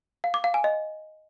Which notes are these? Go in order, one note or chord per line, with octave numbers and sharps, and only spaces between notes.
F5
D6
F5
G#5
D#5